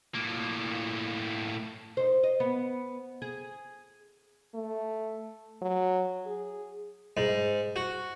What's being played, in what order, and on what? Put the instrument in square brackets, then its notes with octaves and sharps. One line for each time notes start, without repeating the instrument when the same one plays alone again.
[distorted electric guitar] A2 A#3
[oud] D#4 C5
D#5
B3
G#4
[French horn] A3
F#3
G#4
[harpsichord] G#2
F#4